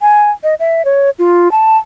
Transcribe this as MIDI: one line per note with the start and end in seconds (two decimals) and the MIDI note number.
0.01 0.31 80
0.43 0.55 75
0.60 0.85 76
0.85 1.10 73
1.19 1.51 65
1.51 1.77 81